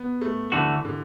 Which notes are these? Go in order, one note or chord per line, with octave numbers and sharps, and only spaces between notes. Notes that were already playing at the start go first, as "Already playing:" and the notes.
Already playing: B3
A3
D2 D3 E3 A3 F#4
D3